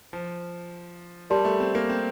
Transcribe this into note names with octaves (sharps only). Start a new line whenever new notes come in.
F3
G3 G4 A#4 D5 A5 C6
A3
C4
A#3
C4